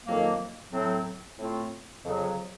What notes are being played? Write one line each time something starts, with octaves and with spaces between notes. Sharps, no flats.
F2 D#3 F#3 A#3
A2 F#3 C4
A2 A3 C4 F4
F2 C#3 F#3